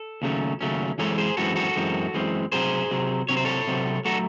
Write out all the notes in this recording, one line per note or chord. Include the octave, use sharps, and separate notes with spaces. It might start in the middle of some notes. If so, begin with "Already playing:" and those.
Already playing: A4
D#2 C#3 F#3 A3 C#4
D#2 C#3 F#3 A3 C#4
F#2 E3 G#3 C4 A4 C#5
G#4 C5
F#2 E3 G#3 C4 F#4 A4
F#4 A4
F#2 E3 G#3 C4
F#2 E3 G#3 C4
C3 F#3 C4 G#4 C5
C3 F#3 C4
C3 F#3 C4 C#5
C5
A4 C#5
C3 F#3 C4
F#3 A3 F#4 A4